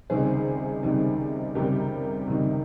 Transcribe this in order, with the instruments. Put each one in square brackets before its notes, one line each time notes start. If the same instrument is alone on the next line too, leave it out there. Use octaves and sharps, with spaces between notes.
[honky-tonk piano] C#2 C3 D#3 G3 G#4 C5
C#2 C3 D#3 G3
C#2 C3 D#3 G3 G4 A#4
C#2 C3 D#3 G3